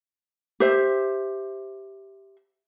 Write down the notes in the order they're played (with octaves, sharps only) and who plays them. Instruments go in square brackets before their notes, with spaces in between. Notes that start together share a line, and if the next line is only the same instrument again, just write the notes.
[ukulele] G4 C5 E5